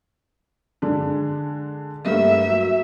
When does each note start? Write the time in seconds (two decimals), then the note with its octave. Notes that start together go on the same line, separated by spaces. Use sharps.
0.82 D3 G#3 D4
2.05 G2 A3 A#3 E5
2.47 F#3